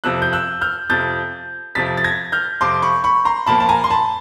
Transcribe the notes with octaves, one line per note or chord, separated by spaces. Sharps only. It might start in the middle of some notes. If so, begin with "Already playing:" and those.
F2 C3 F3 E6 F#6
G6
E6 F#6
F6 G6
F2 C3 F3 G6 A6
F2 C3 F3 A6 B6
A6
G#6 A#6
F6 G6
F2 C3 F3 C6 D6
B5 C#6
B5 C#6
A#5 C6
A#2 F3 A#3 A5 B5
A5
G#5 A#5
C6
A5 B5